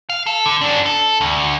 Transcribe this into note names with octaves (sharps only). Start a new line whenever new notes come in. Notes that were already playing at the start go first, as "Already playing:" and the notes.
F5
A4
D3
F#2 D4
A4
D2